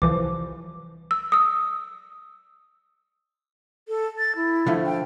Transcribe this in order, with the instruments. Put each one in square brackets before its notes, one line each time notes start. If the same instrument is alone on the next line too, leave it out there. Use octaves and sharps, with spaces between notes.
[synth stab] C2 E3 F3 [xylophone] D6
[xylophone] E6
D#6 E6
[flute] A4
A6
E4
[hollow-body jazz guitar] D3 F3 A3
[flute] G5